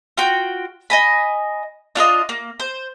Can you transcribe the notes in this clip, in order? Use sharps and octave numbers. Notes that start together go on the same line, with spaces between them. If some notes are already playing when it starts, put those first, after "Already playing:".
F4 F#4 G5
D#5 G#5 B5
D4 F4 A#4 D#5
A#3
C5